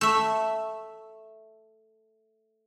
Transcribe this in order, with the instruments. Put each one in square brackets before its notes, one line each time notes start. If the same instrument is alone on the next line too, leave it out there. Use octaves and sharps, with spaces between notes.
[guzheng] A3 E5